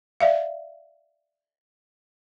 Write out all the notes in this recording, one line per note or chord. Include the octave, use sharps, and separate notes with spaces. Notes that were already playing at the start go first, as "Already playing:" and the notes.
D5 E5 F5